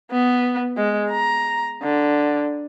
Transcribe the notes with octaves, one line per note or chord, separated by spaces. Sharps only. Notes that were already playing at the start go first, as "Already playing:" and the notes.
B3
G#3
A#5
D3